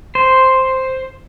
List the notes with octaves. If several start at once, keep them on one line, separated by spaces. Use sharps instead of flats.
C5